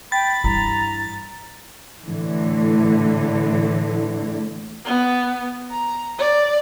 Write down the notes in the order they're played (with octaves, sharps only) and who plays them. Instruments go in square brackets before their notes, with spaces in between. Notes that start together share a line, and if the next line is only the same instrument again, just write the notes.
[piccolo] G5 [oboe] B5 [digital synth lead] A6
[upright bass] G2 E3 [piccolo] A#5
[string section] A2 D3 E3
[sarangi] B3
A#5
D5